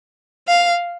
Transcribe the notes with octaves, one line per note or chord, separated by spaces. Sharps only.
F5